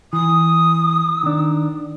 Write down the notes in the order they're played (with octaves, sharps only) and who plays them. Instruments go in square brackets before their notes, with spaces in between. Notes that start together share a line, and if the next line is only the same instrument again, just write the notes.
[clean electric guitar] E3 [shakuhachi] D#6
[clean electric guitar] D#3 D4